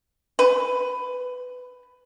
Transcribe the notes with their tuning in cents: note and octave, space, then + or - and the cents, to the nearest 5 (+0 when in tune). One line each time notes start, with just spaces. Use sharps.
B4 +15